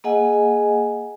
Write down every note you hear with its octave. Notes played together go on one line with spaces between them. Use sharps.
A#3 G#4 D#5 F#5 G#5